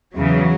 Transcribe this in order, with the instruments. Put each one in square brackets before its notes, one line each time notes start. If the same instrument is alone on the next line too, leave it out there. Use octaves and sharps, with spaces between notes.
[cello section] E2 C#3 E3 F#3